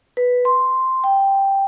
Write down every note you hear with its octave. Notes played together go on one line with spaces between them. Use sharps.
B4
C6
G5